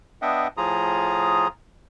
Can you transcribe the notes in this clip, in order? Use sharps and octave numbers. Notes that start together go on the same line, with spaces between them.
B3 D4 D#5 E5 F#5 G5
A2 F3 F4 G#4 A#5 D#6